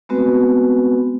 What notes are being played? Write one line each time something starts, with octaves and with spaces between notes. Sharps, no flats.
G#3 A3 B3 C4 F#4 B4